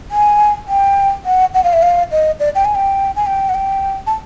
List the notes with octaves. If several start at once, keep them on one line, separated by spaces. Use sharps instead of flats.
G#5
G5
F#5
F#5
F5
E5
F5
D#5
D5
G5
G#5
G5
G#5
G5
F#5
G5
A5